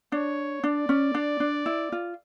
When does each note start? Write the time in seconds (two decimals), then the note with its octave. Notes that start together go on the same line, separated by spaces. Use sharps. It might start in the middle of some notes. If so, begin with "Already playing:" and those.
0.12 D4 C#5
0.64 D4 D5
0.89 C#4
1.15 D4
1.40 D4
1.66 E4
1.92 F4